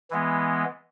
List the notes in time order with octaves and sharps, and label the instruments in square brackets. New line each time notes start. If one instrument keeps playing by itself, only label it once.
[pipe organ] E3 G#3 B3